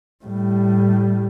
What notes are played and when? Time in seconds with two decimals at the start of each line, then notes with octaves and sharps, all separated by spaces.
0.25 A2 G3